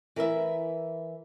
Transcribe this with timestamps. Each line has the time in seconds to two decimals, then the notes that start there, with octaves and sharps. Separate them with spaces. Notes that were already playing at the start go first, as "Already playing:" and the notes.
0.16 E3 A#4 B4 E5